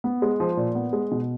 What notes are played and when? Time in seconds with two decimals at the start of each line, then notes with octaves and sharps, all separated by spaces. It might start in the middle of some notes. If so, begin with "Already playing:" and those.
0.04 B3
0.22 G#3
0.40 F3
0.57 A#2
0.75 B3
0.93 G#3
1.12 B2